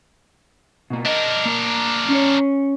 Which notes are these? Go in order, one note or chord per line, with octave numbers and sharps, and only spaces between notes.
B2 A#3
D4 A#4 D#5
A#3
C#4 C#5